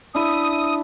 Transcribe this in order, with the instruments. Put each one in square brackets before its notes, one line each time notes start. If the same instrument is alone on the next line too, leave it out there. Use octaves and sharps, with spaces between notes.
[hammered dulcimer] D4 E4 E5 [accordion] D#6